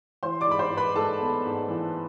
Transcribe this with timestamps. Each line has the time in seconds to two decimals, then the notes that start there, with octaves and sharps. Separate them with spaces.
0.23 E3 C5 C6
0.41 D5 D6
0.47 G#2 B5
0.59 C5 C6
0.71 G#2
0.77 B4 B5
0.96 G#2 A4 A5
1.20 B3
1.45 G#2
1.68 E3